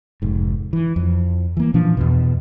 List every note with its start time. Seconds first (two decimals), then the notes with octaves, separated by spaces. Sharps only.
0.22 F1 G#2
0.73 E3
0.96 F2
1.57 E3 A#3
1.74 A#2 E3 F3 D4
1.97 E2 G#2 B2